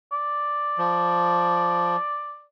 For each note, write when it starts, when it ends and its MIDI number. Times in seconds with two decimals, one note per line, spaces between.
0.12 2.44 74
0.78 1.96 53